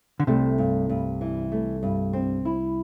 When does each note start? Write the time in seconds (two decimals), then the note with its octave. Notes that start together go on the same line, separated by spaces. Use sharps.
0.20 D3
0.27 C2 C3 A3
0.58 G2
0.89 G2
1.21 E3
1.52 A3
1.83 G2
2.13 C4
2.45 E4